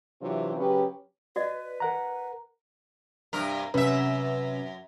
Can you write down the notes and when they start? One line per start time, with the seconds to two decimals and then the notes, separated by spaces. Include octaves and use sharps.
0.20 C3 E3 F#3 C4 D4 F4
0.56 C#3 F#3 C#4 G4 B4
1.36 F#4 B4 D5 D#5
1.80 A#4 F#5 A#5
3.33 G2 C3 A#4
3.74 F#2 C3 C#4 B4 E5